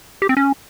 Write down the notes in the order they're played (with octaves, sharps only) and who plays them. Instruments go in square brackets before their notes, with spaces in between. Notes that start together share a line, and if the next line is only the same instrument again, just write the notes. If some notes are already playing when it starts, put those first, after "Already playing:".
[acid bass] G4
C4
C#4